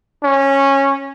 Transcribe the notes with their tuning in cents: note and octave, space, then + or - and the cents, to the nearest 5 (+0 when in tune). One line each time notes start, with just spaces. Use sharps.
C#4 -15